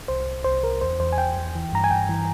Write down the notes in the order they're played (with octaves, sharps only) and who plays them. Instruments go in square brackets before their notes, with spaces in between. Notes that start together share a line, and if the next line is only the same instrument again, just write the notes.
[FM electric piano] C2 C5
C2
C2 C5
C2 A#4
E2 C5
E2 C5
G#5
E2 G5
E2
E3
G2 A#5
G#5
G2 G5
E3